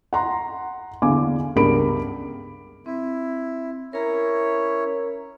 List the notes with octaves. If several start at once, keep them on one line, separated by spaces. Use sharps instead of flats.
F#5 A#5 C6
E2 D3 F5 G#5 D6
C#2 G2 B3 A#4 B5 D7
C4 E4
C#4 E4 A#4 C#5 A#5